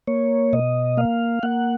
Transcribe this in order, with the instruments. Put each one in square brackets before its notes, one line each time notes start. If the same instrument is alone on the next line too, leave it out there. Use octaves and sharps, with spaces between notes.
[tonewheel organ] A#3 C#5
B2 D#5
A#3 F5
A#3 F#5